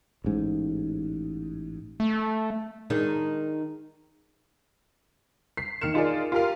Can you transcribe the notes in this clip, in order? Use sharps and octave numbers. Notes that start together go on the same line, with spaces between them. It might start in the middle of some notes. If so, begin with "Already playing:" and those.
A1 G#2
A3
D#3 G#3 D4
B6 C7
D#3 A#3 F6 C#7 E7
D#4 F4 G#4 A#4 D5
F4 G4 A#4 F5